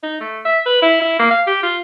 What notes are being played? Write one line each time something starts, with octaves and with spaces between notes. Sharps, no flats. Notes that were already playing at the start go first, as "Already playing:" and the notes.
D#4
A3
E5
B4
E4
E4
A#3
F5
G4
F4